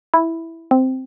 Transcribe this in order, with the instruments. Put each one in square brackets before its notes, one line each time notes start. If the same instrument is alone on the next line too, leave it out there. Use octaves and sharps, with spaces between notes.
[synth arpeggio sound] E4
C4